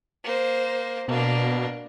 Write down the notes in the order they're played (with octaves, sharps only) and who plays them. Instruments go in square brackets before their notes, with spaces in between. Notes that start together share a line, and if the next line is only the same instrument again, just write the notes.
[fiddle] A#3 C5
[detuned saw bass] B2 [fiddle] A#3 D4